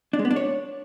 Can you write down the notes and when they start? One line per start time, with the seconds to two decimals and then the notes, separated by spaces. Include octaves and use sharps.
0.13 D4
0.19 G#3
0.25 B3
0.31 D4
0.36 C#5